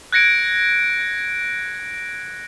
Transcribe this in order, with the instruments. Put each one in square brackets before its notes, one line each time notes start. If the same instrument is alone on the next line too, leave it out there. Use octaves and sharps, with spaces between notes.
[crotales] F#6 G#6 A#6 C#7 D7